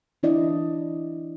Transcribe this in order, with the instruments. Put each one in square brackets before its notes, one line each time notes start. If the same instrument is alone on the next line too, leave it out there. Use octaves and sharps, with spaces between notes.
[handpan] E3 D4 E4 D5 D#5